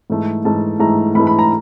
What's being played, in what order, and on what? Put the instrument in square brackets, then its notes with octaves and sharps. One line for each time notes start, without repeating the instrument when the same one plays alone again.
[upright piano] G#2 E3 A3
G#2 E3 A3 A5
G#2 E3 A3 A#5
G#2 E3 A3 B5
B5
A#5